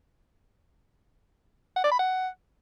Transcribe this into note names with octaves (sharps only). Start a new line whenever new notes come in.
F#5
D5
B5
F#5